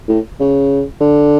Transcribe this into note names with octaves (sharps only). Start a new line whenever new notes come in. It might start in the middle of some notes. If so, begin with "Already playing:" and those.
A2
C#3
D3